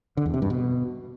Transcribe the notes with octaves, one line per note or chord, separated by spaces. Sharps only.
D3
E2
C3
G2
B2